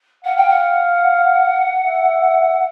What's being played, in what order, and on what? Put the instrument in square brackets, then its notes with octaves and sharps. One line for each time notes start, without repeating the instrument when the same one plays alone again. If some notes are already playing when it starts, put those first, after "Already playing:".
[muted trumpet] F5 [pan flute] F#5
[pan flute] G5
F#5
[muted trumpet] E5